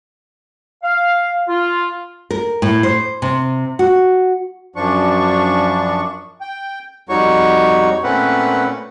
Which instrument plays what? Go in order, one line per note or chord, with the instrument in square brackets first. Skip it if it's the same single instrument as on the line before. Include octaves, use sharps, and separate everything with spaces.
[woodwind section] F5
F4
[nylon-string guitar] A#4
A2
C5
C3
F#4
[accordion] F#2 F3 D4 C#6
G5
[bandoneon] F2 G3 D#4 F#4 C#5 C#6
A#2 A3 C4 C#4 B4 F#5